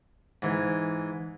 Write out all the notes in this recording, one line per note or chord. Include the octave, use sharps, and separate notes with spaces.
G#2 E3